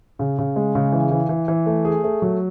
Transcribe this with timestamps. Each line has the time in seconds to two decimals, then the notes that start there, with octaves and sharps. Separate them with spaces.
0.19 C#3
0.38 C#3
0.56 G#3
0.75 C#3
0.92 E3
1.11 E3
1.29 E3
1.48 E3
1.66 A3
1.85 G#4
2.04 A3
2.22 F#3